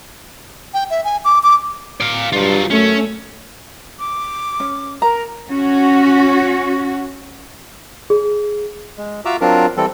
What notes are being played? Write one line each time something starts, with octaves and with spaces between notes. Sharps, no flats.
G5
E5
G#5
D6
D6
D5 F5
G2 F#3 F4
F#2 A3 C#4
D6
C#4
A#4 A#5
C#4 F#4
G#4
G#3
F4 F#4 E5 A#5 D6 E6
F#3 C4 D4 F4 A#4
E3 G3 C4 A4